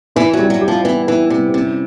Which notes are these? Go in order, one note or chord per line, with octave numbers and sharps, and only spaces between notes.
E3 E4
F#3
G3
F#3
G4
F3
E3 B3
E3 E4
C3 G3
C3 C#4